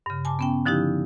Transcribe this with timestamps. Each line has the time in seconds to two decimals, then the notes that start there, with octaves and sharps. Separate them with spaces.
0.06 G2 C#3
0.25 G#5 A5 D6
0.39 B3 C#4 G5
0.66 D3 F3 D#4 E4 G4